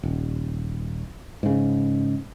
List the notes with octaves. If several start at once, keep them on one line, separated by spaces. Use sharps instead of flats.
D#1
G#2 C#3